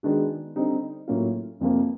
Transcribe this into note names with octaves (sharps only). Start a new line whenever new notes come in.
D#3 G#3 B3 D4 F#4
D3 G3 C4 D#4
A2 F#3 A#3 C#4 F4
F1 F2 C3 F3 A#3